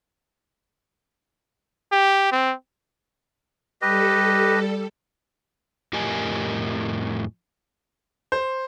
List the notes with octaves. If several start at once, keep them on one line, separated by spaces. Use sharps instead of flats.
G4
C4
G3 G4 A4 B4 D#5
F2 A2 G4 A#4 D#5 G#5
C5